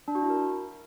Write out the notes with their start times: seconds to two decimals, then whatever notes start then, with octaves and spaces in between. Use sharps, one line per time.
0.08 D4
0.15 F#4
0.22 E4
0.30 A#4